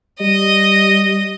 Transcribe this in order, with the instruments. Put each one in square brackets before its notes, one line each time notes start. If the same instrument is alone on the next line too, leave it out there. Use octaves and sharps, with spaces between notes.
[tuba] G3 [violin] D#5